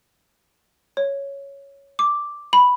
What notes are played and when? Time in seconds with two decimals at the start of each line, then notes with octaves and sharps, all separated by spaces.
0.97 C#5
1.99 D6
2.53 B5